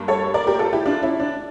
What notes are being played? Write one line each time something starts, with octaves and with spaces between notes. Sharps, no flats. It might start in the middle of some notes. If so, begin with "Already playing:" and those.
Already playing: G2 G3 A#3
A4 C#5
A#4 D5
G4 A#4
F4 A4
E4 G4
D4 F4
C#4 E4
D4